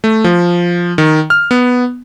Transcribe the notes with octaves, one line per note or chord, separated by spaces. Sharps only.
A3
F3
D#3
F6
B3